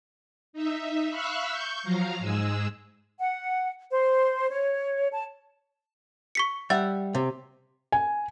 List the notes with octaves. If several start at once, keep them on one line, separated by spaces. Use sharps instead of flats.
D#4 E5
E5 F5 B5 C#6 E6 F#6
C#6 G6
F3 F#3 F5 A#5
G#2 G#3 G#4 E6
F#5
C5
C#5
A5
C#6 B6 C#7
G3 E5 F#5 A6
C3
G#5